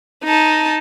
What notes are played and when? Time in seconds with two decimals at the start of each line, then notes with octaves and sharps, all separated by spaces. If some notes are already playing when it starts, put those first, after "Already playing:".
0.24 D#4 A5